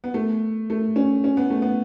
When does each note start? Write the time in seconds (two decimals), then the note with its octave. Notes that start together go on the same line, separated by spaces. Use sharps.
0.04 B3
0.14 A3
0.70 A3
0.96 C#4
1.24 C#4
1.37 B3
1.50 A3
1.62 B3